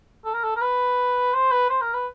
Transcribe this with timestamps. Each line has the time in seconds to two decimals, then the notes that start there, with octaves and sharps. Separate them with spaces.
0.25 A4
0.34 A#4
0.43 A4
0.56 A#4
0.61 B4
1.34 C5
1.52 B4
1.70 C5
1.81 A#4
1.94 B4